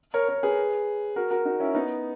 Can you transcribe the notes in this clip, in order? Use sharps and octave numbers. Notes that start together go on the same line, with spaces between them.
A#4 C#5
A#4 C#5
G#4 B4
F#4 A#4
F#4 A#4
D#4 F#4
C#4 E4
B3 D#4